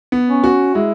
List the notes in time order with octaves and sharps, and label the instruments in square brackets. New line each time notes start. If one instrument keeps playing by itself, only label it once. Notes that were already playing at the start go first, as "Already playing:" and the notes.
[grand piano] B3
[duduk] C#4
[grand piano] F#4
[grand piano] G#3 [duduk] E4